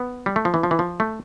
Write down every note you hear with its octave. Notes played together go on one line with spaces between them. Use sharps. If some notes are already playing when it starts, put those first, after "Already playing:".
Already playing: B3
G3
A3
F3
E3
F3
E3
F3
A3